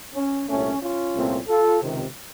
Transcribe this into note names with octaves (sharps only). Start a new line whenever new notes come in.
C#4
C2 A#2 A3 C#4
C#4 F4
C2 A#2 A3 C4
F4 A4
C#2 C3 D#3